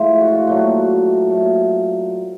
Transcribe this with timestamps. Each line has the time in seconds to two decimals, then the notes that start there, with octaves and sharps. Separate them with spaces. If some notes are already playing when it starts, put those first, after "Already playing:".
Already playing: A2 F3 G#3 C5 E5
0.21 F#4
0.28 F4
0.35 F#4
0.47 A#2 F#3 A3 F#4
1.27 A#2 F#3 A3